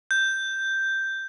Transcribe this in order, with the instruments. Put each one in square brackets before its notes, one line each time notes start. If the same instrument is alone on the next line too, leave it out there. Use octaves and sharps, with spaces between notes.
[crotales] G6